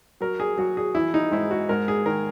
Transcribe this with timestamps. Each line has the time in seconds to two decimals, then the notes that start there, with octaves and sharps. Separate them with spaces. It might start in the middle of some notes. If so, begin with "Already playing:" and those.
0.21 F#3 A#4
0.40 G#4
0.58 F#3 F#4
0.77 G#4
0.95 E3 E4
1.14 D#4
1.32 G#2 E4
1.51 F#4
1.69 G#2 A#4
1.88 G#4
2.06 D#3 A#4